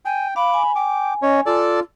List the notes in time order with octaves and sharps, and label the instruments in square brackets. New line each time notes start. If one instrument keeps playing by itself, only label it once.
[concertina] G5 [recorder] G#5
[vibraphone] F5 [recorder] B5 [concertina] D6
[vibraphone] G#5
[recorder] G5 [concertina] D6
[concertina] C#4 C#5 [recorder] D#5
[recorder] F4 [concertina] A4 D5 A5